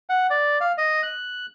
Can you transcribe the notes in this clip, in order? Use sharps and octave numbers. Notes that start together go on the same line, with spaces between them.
F#5
D5
F5
D#5
F#6